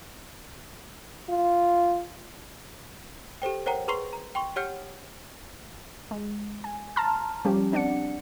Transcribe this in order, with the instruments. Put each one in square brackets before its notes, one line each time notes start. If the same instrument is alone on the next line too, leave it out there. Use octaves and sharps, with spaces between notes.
[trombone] F4
[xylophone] G4 A4 C5 G5
A#4 C5 C#5 F#5 G5 A#5
G#4 B4 A#5 C6 C#6 C7
A#5
G5 C6 C#6
G4 C#5 F#5 F6 G6 C#7
[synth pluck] G#3
G#5
A5 A#5 C6 F6
F3 G3 C#4 G4
C4 D4 D5 F#5 C#7